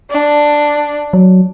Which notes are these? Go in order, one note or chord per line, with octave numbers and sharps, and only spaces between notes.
D4
F#3